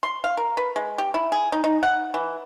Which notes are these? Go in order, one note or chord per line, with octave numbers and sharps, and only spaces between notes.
C6
F5
A#4
B4
G#3
G4
E4
G#4
D#4
D#4
F#5
E3